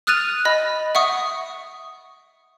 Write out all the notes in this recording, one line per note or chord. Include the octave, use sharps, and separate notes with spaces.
D#6 F6 F#6 A6 D#7 F7
D#5 B5
E5 F#5 C#6 D#6